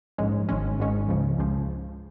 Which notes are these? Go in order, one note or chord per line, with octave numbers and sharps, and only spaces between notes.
A#1 G#2 G#3 C#4
G#1 G#2 G#3 C#4
G#1 G#2 G#3 C#4
C#2 C#3 F3
C#2 C#3 F3